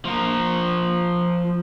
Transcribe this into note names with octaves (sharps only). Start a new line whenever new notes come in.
F3 A#4